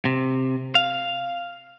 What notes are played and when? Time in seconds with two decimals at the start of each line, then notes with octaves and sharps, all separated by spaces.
0.05 C3
0.75 F5